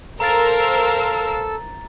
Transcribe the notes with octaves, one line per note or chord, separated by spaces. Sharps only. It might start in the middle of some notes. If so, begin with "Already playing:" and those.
A4 A#4 C5 F5 A#5 E6 A6